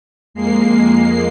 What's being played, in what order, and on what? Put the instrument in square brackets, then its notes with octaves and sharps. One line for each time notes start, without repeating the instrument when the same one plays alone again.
[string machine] F2 G#3 A#3 C7